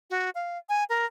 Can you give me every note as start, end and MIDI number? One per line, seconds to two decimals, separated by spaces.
0.10 0.30 66
0.35 0.58 77
0.69 0.84 80
0.89 1.05 70